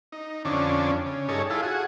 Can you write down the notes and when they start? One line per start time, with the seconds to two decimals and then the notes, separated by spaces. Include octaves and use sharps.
0.12 D#4
0.45 F2 D3 C#4 D4
1.06 C#3
1.28 G2 D#4 G#4 A4 C#5
1.50 E4 F4 G#4 A4
1.63 F#4 G#4